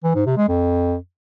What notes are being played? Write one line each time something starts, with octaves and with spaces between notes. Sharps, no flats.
E3
G#2
C3
G#3
F2